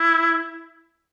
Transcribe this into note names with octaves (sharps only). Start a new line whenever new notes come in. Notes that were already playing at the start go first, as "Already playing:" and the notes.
Already playing: E4